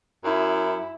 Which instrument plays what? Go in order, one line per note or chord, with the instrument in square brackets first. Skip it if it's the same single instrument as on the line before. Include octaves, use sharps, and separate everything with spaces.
[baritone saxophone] F#2 [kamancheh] E4